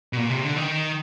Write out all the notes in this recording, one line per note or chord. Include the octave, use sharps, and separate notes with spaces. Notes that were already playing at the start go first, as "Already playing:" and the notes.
B2
A#2
C3
D3
D#3